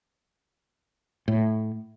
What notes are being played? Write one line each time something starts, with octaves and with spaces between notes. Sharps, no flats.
A2